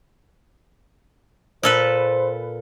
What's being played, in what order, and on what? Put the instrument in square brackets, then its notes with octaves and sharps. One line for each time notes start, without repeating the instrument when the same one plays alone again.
[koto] A#2 A4 B4 [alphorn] C5